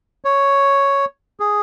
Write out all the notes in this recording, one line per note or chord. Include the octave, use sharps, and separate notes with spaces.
C#5
G#4